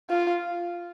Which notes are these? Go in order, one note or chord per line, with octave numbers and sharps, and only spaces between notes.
F4